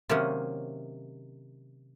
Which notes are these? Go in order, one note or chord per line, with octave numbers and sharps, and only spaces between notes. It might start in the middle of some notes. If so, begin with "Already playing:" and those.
C3 D#3 F#3 A#3 C#4